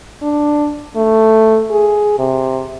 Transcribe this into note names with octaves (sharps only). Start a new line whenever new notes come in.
D4
A3
G#4
C3